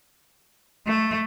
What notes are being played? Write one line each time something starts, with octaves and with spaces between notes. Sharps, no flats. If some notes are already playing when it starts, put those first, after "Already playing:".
A3